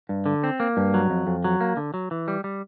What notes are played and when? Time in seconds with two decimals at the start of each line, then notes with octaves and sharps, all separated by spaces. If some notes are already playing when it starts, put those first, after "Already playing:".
0.09 G2
0.26 D3
0.44 C4
0.60 A#3
0.77 G2
0.94 F#3
1.10 F2
1.27 F2
1.44 F#3
1.61 A#3
1.77 D3
1.94 F#3
2.11 E3
2.28 G3
2.44 G3